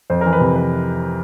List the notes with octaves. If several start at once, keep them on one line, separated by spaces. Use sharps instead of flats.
F2 C5
A#4
E3
B4
C3
B4